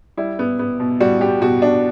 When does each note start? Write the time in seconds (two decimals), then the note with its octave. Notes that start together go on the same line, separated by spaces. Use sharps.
0.17 G3 E4
0.39 B3
0.59 B3
0.80 B2
1.00 G3 F#4
1.21 G3 G4
1.41 B2 F#4
1.62 B2 D4